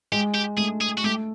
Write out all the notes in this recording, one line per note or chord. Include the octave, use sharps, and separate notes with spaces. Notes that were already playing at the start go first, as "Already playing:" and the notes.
G#3 G4
G4
A3 G#4
G#4
F#4
A3 G4